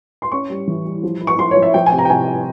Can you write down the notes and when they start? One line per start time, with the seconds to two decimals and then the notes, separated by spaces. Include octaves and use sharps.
0.22 C6
0.32 C#4 C#6
0.50 G3
0.67 E3
0.85 G3
1.03 F3
1.21 E4
1.27 C#6
1.39 F3 C6
1.51 C#5
1.57 F3
1.62 E5
1.74 F3 G5
1.86 G#5
1.92 C3
1.99 A#5
2.05 G5
2.10 C3 G#5